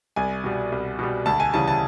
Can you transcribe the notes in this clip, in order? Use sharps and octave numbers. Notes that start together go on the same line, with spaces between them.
C2 G#5
B2 G3
C2
B2 G3
D2 A5
G#5
C#3 E3 G3 A5
A5